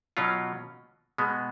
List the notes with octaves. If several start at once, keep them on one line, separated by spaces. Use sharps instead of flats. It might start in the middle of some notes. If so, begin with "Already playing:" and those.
B2 F#3 C#4 F4
B2 G#3 B3